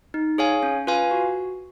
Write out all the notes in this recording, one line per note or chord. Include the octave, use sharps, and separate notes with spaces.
D#4
G#4 C#5 F5 G#5
C#4
F4 B4 F5 G#5
F#4